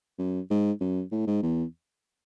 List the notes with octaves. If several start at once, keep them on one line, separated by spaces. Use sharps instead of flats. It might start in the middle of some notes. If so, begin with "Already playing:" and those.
F#2
G#2
F#2
A2
G#2
E2